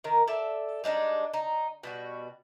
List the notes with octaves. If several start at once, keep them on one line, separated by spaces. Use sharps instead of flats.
D#3 A#4
A4 D5 E5
G3 G#3 D4 D#4
D#4
B2 G3 F#4